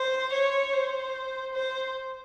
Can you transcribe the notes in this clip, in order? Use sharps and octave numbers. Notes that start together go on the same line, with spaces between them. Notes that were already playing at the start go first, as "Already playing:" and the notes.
Already playing: C5
C#5
C5
C5